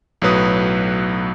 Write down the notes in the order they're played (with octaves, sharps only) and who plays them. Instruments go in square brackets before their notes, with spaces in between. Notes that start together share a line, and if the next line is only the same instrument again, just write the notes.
[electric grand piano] B1 A2 F#3 B4 D#6